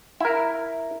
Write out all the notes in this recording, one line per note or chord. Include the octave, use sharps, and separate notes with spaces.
E4 A#4